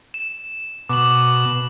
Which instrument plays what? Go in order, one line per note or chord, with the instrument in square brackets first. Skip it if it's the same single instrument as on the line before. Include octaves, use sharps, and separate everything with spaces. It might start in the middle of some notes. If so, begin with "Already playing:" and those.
[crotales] E7
[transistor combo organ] B2 [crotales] D6 F#7